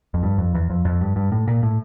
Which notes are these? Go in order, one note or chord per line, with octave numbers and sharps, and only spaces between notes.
F2
G2
F2
E2
F2
F2
G2
G2
A2
A#2
A2